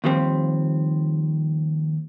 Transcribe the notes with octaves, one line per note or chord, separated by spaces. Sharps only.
D#2 F3 G3 C4